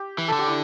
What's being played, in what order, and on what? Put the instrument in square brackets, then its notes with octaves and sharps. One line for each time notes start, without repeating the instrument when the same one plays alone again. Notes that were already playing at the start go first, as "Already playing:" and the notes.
Already playing: [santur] G4
[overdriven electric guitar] E3
[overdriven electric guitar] D3 [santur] A4
[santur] G4
E4